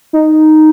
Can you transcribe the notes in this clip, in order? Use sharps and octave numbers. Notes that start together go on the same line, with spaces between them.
D#4